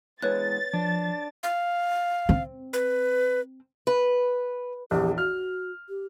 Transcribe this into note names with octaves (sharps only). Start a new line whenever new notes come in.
E2 G#3 B4 C#5 F#6 A6
F3 D4
F5
C4
B4
B4
A#1 E2 G4
F#4 F6
G4